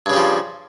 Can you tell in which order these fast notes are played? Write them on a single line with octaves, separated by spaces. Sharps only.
G2 C#3 G3 F3